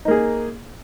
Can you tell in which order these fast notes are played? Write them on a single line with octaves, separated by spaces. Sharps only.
D#4 A#3 G#4